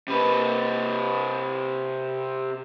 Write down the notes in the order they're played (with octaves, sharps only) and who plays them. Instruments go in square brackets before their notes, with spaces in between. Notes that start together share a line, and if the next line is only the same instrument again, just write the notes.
[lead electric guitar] C3 B4